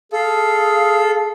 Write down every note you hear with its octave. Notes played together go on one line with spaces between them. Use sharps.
G#4 A4 F5